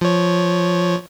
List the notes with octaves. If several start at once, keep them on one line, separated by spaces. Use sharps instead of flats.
F3 C#5